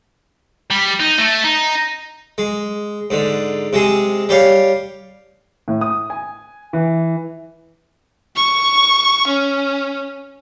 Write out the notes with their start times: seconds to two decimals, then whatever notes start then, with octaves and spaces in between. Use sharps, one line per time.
0.71 G3
1.00 D#4
1.18 A3
1.44 D#4
2.38 G#3
3.10 G#2 D3
3.73 C3 G#3 G#4
4.29 G3 G4 C#5 F5
5.68 A2
5.81 D#6
6.10 G#5
6.73 E3
8.36 C#6
9.27 C#4